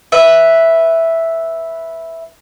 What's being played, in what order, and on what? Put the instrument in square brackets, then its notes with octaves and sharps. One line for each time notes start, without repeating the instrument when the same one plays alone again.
[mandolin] B4 E5